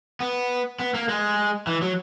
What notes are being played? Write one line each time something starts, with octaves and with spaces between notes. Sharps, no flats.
B3
B3
A#3
G#3
E3
F#3